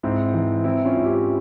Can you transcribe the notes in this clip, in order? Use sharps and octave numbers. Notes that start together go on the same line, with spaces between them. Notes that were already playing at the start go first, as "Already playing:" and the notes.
G#2 C4 E4
E3
E3 C4 E4
C#4 F4
G#2
E4 G4